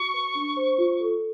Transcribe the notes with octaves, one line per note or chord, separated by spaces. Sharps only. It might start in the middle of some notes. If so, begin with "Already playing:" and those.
Already playing: F#4 C#6
B4
D4
C5
F4
A4